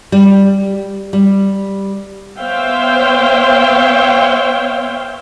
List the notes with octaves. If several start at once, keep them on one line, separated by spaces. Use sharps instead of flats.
G3
G3
B3 C5 C#5 E5 F5 G5